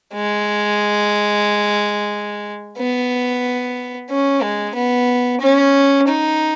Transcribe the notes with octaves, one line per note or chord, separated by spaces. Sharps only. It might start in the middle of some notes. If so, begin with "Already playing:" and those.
G#3
B3
C#4
G#3
B3
C#4
D#4